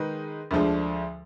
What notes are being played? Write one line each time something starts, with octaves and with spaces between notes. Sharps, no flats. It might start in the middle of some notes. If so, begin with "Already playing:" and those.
Already playing: D#3 G#3 D#4 G#4 B4
D2 D3 F3 G#3 D4